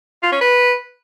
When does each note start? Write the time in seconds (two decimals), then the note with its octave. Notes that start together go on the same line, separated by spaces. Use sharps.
0.23 F4
0.32 C#4
0.41 B4